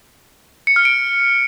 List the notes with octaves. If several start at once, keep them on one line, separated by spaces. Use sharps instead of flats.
C#7
F6
D7